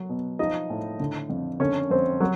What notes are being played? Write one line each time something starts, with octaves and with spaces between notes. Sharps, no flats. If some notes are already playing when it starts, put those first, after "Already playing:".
Already playing: F#3
B2
F3 D#4 D#5
A2
D3
F2
D3 C#4 C#5
F2 C4 C5
F#3